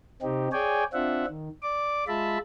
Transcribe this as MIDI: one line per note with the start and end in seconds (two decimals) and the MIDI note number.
0.22 0.48 48
0.22 0.48 60
0.22 0.48 63
0.22 0.48 67
0.52 0.84 68
0.52 0.84 73
0.52 0.84 74
0.52 0.84 79
0.52 0.84 80
0.93 1.25 60
0.93 1.25 62
0.93 1.25 65
0.93 1.25 76
0.93 1.25 78
1.27 1.49 51
1.63 2.04 74
1.63 2.04 86
2.08 2.38 56
2.08 2.38 65
2.08 2.38 76
2.08 2.38 81
2.08 2.38 83